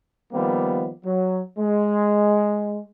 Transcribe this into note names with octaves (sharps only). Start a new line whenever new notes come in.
D#3 F3 G3 A#3 B3
F#3
G#3